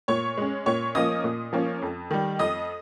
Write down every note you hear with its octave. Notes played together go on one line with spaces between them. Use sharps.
A#2 C#5 C#6
G#3 C#4
A#2 C#5 C#6
F3 A#3 C#4 D#5 D#6
A#2
F3 A#3 C#4
F2
D#3 G3
F2 D#5 D#6